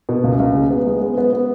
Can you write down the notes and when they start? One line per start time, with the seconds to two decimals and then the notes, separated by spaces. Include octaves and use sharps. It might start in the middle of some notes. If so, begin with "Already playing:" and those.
0.09 B2
0.24 C#2
0.40 C#2
0.55 G#3
0.70 B3
0.86 G#3
1.02 B3
1.18 B3
1.33 B3